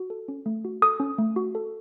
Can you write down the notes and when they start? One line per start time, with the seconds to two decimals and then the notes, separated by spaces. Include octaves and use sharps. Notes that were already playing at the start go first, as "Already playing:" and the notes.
Already playing: F#4
0.10 A4
0.28 C#4
0.46 A3
0.65 F#4
0.82 A4 D#6
1.00 C#4
1.18 A3
1.36 F#4
1.55 A4